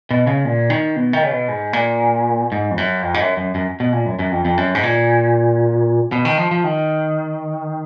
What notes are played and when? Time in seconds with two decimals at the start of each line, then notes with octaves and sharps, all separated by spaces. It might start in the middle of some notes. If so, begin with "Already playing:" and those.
0.11 B2
0.27 C#3
0.45 A#2
0.70 D#3
0.96 B2
1.13 D#3
1.23 C#3
1.31 B2
1.48 G#2
1.73 A#2
2.52 G#2
2.71 F2
2.78 F#2
3.02 F2
3.14 G#2
3.21 F#2
3.37 F#2
3.55 F#2
3.80 B2
3.93 A#2
4.06 F#2
4.19 F#2
4.31 F2
4.45 F2
4.57 F#2
4.75 G#2
4.83 A#2
6.12 B2
6.25 D#3
6.38 F3
6.51 F3
6.64 D#3